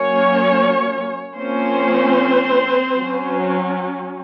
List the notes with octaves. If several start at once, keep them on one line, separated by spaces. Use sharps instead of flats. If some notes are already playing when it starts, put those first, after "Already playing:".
Already playing: F#3 A#3 C#4 C#5
F3 A#3 C4 C#4 C5
F#3 C#4